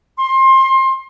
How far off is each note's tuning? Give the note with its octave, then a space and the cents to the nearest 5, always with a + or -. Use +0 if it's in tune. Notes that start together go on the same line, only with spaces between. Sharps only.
C6 +25